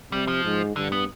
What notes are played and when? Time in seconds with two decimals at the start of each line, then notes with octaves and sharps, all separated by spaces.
0.12 C3 G3
0.28 F3
0.45 G#2
0.76 G2 D3
0.92 B3